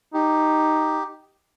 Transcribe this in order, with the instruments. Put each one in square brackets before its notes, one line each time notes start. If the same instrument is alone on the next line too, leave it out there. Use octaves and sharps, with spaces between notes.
[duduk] D#4 [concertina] G4